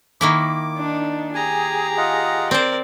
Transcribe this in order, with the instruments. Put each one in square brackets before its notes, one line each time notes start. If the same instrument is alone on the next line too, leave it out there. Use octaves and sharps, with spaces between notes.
[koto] D#3 A#3 E4 [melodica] D6
[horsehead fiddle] D4 D#4
[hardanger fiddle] G4 A#5 [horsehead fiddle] G#4 [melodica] G#5
[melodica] F4 D#5 F#5
[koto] C4 C5 [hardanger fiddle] A#4 D5